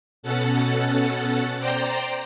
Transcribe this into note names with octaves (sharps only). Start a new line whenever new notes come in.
B2 C#4 A4 F#5 A6
C5 D5 G5 A#5